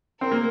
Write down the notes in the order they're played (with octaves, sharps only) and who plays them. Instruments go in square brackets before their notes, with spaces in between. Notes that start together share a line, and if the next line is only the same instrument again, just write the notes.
[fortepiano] C4 [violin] A#4
[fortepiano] A#3